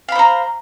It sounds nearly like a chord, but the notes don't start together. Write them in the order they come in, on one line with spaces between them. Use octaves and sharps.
F5 B5 C5 A#5